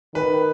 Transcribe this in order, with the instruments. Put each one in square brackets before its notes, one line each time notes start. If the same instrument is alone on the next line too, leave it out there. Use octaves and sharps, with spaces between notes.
[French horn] D#3 [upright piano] B4